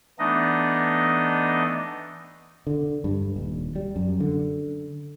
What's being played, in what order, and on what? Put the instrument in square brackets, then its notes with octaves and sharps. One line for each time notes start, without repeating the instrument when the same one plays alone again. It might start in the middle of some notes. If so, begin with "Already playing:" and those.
[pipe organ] E3 A3 B3 D4 D#4 D#5
[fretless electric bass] D3
G2
D#1
G3
F#2
D3